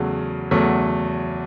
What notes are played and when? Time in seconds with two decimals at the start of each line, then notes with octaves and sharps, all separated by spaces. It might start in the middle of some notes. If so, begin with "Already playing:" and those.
Already playing: E2 C#3 F#3 A3
0.51 E2 C#3 F#3 A3